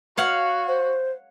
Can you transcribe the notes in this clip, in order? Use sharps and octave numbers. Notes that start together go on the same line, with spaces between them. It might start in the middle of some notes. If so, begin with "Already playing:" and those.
F#4 C#5 F5 F#5
C5